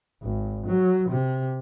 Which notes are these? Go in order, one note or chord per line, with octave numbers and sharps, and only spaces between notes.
G#1
F#3
C3